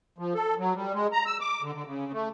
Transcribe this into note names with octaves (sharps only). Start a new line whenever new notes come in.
F3
A4
F#3
G3
G#3
A#5
E6
D6
D3
D3
C#3
A3